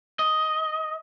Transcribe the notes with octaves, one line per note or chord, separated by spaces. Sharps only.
D#5